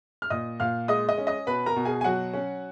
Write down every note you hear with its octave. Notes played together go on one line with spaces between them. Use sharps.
F6
A#2 D#5 D#6
A#2 F5 F6
G#3 D#5 D#6
D#5 D#6
C#4
D#5 D#6
B2 B4 B5
A#4 A#5
B2
G#4 G#5
G#5
F#3 F#4 F#5
C#4